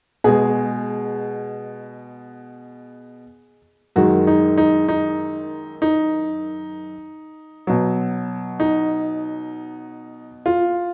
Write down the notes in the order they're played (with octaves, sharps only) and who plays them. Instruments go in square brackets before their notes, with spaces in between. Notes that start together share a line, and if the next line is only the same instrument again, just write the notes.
[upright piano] B2 G#3 G#4
F#2 D#3 G#3 F#4
D#4
D#4
D#4
D#4
B2 F#3
D#4
F4